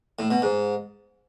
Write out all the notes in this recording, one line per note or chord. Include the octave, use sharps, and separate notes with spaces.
A2
B2
G#2